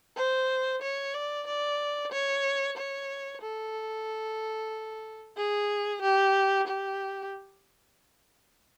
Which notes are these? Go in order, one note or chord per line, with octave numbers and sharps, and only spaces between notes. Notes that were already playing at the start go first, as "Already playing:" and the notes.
C5
C#5
D5
D5
C#5
C#5
A4
G#4
G4
G4